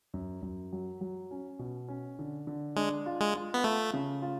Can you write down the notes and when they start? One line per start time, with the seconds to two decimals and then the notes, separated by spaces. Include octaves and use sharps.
0.14 F#2
0.42 F#2
0.73 F#3
1.01 F#3
1.31 C#4
1.59 B2
1.88 C#4
2.19 D3
2.47 D3
2.76 G#3 D4
3.06 F4
3.21 G#3
3.35 F4
3.54 B3
3.64 A3 F4
3.94 C#3
4.22 F4